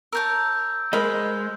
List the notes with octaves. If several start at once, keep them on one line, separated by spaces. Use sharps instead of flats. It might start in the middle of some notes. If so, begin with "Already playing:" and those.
A#4 C#5 A5 E6 G6
G#3 A#4 C5 D#5 B5